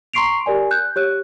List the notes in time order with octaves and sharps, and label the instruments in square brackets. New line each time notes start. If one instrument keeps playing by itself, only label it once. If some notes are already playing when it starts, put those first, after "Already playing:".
[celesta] A#5 C6 C#6 C7 D7 F7
G4 A#4 D5 G#5
F#6 G6
G4 C#5 F#6